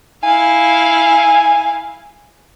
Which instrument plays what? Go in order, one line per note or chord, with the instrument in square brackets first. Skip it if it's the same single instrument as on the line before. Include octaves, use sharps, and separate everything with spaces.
[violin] E4 F5 [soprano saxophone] G#5